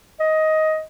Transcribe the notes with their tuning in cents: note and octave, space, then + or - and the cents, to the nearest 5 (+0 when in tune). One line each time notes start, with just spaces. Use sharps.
D#5 +15